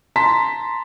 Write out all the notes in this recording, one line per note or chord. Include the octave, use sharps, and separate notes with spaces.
A5 A#5 C6 B6